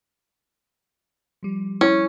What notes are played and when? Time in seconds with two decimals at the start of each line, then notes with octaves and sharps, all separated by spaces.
1.43 F3 G3
1.81 C#4 E4